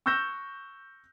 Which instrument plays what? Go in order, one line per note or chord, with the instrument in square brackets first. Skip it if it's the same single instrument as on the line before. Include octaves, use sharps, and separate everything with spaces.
[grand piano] C#6 E6 F#6 G6 A#6 E7